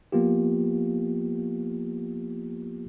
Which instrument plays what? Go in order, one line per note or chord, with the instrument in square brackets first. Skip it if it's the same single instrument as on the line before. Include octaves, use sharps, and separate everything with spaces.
[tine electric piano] F3 A#3 B3 F4 G4